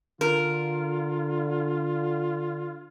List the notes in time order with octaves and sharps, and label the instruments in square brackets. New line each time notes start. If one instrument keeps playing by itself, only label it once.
[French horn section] D3 [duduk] F4 [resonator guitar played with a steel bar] A#4